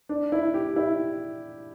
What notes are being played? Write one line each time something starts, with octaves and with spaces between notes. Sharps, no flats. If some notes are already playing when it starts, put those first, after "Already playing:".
D4
E4
G4
E4